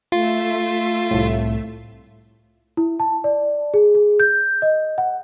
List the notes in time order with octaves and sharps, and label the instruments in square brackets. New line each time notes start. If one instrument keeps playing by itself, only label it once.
[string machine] A3 E5 [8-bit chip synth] F4
[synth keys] C2 A2
[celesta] E4
A5
D5
G#4
G#4
G6
D#5
F#5